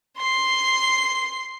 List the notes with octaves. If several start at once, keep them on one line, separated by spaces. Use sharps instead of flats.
C6 C7